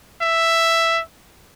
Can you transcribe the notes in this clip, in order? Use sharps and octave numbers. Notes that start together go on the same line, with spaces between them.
E5